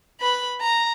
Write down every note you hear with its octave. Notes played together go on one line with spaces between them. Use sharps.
B4 B5
A#5